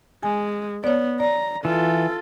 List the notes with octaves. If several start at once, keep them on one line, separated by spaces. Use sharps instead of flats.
G#3 G#5
B3 C#5 D5
D5 A#5
E3 F4 A4